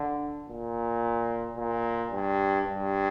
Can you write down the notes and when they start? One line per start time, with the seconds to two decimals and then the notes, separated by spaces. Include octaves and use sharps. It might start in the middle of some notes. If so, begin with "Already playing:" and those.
Already playing: D3
0.49 A#2
1.57 A#2
2.11 G2
2.65 G2